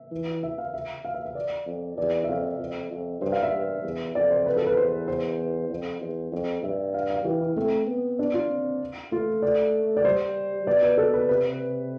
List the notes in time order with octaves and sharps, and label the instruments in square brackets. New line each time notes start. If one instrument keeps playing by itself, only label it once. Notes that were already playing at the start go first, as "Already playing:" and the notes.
Already playing: [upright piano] E5
[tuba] E3
[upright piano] E5
F5
E5
F5
E5
E5
D5
[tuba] F2
[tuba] E2 [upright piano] D5
[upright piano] E5
[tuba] F2 [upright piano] F5
[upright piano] E5
[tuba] F2
F2
[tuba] G2 [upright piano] C5
[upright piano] F5
E5
[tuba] G2
E2
[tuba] F2 [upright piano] D5
[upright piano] C5
B4
A4
B4
[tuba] E2 [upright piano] C5
[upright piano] C5
[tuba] F2
E2
F2
[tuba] G2 [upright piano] E5
[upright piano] F5
F5
[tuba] E3 [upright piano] G4
[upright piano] E4
[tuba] A3 [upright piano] C4
[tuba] B3
[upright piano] D4
F4
[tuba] C4
[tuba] A3 [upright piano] F4
[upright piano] D5
D5
[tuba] G3 [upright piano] C5
[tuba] B2 [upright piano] D5
[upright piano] B4
A4
B4
[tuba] C3 [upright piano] B4